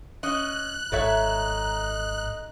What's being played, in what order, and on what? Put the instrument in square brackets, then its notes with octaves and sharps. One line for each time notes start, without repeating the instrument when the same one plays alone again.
[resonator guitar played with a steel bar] C#4 D#5 [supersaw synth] F#6
[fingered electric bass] G#1 G#2 [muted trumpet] D#4 [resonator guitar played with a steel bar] A4 C#5 E5